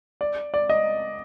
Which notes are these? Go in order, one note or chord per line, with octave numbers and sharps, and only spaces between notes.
D5
D5
D#5